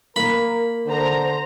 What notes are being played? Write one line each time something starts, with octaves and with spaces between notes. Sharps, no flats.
A#3 A#4 B5
D3 C5 A#5